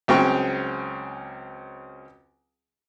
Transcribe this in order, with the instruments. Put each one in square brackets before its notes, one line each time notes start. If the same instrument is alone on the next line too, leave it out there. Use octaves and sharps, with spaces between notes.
[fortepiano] C#2 C#3 F#3 C4 G5 C#6